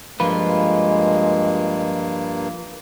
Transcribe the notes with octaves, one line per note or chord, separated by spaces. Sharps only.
G2 F3 G#3 A#3 F4 B4